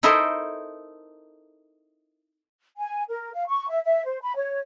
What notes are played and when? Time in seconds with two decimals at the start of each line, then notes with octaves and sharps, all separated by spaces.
0.03 D#4 E4 A4 A#4 C5 D#5
2.78 G#5
3.09 A#4
3.33 F5
3.48 C#6
3.69 E5
3.85 E5
4.05 C5
4.22 B5
4.36 C#5